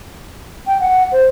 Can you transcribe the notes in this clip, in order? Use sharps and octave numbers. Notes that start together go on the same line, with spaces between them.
G5
F#5
C5